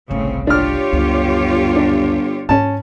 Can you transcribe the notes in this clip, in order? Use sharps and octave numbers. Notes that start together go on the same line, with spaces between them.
G1 C2 A2 C#3 C4
D4 F4 G4 C#5 F6
G1 C#2 F#2
D4
G#2 C#4 E4 A5